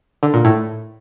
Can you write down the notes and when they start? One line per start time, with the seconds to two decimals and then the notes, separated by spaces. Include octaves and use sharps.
0.23 D3
0.34 A#2
0.45 A2